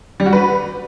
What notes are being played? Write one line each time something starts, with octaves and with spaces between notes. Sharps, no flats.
G3
F#4
B4